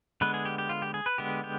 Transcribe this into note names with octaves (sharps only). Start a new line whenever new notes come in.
D3 G#3 B3 B4
G#4
G4
G4
F4
G4
G#4
B4
D3 G#3 B3 G4
G4